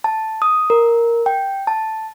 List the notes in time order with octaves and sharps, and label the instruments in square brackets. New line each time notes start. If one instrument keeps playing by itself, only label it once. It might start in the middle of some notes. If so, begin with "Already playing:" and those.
[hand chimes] A5
D#6
A#4
G5
A5